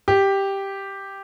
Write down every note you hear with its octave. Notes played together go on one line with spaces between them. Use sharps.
G4